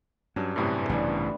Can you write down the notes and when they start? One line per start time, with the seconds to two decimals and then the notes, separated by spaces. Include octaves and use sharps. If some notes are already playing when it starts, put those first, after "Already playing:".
0.36 G2 F#3 C#4 D4
0.56 F#2 A2 C3 A3 B3 G#5
0.89 A1 G2 C#3 G3 D4